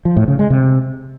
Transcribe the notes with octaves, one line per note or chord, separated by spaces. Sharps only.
F3
A2
C#3
G#3
C3